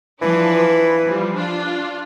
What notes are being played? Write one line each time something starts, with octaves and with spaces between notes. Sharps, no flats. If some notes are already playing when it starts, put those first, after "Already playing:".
E3 F3 D4 B4
F3 G3
D4 F4